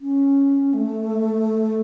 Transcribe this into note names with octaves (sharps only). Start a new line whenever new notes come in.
C#4
A3